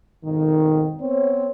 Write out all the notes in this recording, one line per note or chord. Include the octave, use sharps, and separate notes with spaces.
F2 G#2 B2 D#3
B3 C4 C#5